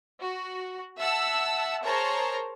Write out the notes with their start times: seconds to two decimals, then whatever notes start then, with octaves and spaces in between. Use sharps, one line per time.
0.21 F#4
0.99 E5 F#5 A5 E6
1.84 G#4 A#4 C5 C#5 A5 A#5